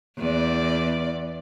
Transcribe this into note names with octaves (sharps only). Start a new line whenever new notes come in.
E2 D5